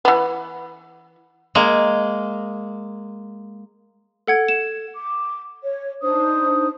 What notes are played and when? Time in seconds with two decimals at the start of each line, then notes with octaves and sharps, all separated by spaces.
0.05 E3 B3
1.55 G#3 A#3
4.27 A4 F#5 G#6 D7
4.49 E7
4.95 D6
5.64 C#5
6.02 D4 D#4 C5 D#6